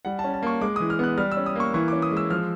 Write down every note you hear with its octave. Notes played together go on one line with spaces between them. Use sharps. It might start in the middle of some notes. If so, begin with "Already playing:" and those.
G3 F#5
A5
C#4
A5
A#3 C#6
G#3 D6
E3 D#6
F6
B3 F#6
G3 F6
E6
C#4
D#6
A#3 C#6
E3 C#6
C#4 D6
D#6
G#3
E6
F3 F6